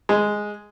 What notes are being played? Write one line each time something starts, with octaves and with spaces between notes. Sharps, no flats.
G#3